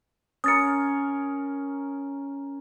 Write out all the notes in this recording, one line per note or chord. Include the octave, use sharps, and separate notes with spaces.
C#4 A#4 D#6 A6 C#7